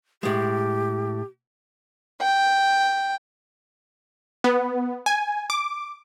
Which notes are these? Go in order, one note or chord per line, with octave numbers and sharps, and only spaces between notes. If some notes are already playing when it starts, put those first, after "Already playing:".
A2 G#3 G4
G5
B3
G#5
D6